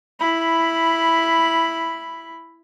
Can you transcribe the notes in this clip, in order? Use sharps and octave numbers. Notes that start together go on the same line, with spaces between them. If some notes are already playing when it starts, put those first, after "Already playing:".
E4 B5